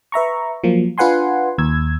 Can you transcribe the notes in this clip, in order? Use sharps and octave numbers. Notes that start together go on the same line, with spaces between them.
B4 E5 A#5 C#6
F3 F#3 A#3
D4 F4 B4 F#5 G#5 C6
D#2 E6 G#6